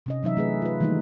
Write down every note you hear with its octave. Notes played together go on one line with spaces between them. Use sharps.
C3 C#4 D#5
E3 F#3 D#4 E5
A3 G#4 B4
F4 B4
D#3 E3 G3 A3 A#3 D#4